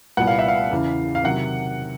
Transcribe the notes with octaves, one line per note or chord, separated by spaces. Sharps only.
C2 A#2 G3 B3 F#5
F5
E5
F5
E2 C#3 E3
F5
C3 D#3 F#3 F#5